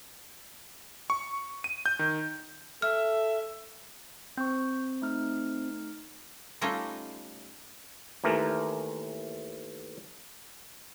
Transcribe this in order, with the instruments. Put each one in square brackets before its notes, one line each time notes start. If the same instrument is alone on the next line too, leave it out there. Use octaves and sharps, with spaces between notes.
[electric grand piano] C#6
D#7
G6
D#3
[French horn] A4 [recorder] E5 [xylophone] F6
[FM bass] C4 [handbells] C#6 G6
[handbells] A3 D#4 F6
[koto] G3 A3 C#4 D#4 F4 D#5
[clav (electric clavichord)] D#2 E3 A3 A#4